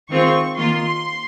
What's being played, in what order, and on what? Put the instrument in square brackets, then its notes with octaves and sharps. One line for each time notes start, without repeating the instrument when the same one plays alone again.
[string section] D#3 G#3 C4 F4 C#6
D#3 A#3 F4 C6